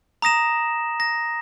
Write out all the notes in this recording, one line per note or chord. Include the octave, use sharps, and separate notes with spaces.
A#5 D#6 A#6 E7
A#6